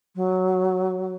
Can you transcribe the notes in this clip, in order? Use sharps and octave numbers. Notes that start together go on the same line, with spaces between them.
F#3